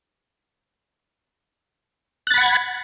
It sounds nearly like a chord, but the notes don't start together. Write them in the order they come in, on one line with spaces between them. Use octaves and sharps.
F#6 A6 B5 F#5 G#6